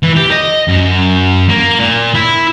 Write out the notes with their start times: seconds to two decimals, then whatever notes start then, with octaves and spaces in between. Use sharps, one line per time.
0.03 E3
0.17 G4
0.31 D#5
0.68 F#2
1.49 A#3
1.79 A#2
2.15 E4